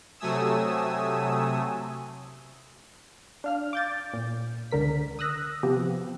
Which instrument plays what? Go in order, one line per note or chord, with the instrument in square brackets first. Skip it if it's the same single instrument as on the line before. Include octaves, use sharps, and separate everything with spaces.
[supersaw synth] C3 F#3 A3 G#5 D#6 E6
[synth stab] D4 F5 F6
D6 G6 A6
A#2
C#2 D3 A#4 B6
D#6 E6 F#6 A#6
C3 F3 B3 G4